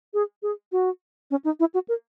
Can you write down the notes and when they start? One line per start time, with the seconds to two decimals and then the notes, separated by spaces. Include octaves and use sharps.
0.14 G#4
0.43 G#4
0.72 F#4
1.31 C#4
1.44 D#4
1.60 E4
1.74 F#4
1.88 A#4